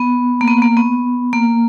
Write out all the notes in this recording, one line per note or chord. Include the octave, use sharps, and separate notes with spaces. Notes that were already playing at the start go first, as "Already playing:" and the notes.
Already playing: B3
A#3
B3
A#3
B3
A#3